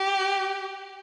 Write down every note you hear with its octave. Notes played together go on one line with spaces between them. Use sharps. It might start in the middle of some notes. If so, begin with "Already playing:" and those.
Already playing: G4